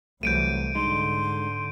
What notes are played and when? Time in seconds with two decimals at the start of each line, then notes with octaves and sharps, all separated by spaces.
0.23 C2 E3 F#3 A3 G6 D7 D#7
0.75 G#2 D3 G#3 D#4 C6